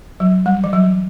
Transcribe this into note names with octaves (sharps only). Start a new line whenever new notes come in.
F#3
G3
E3
F#3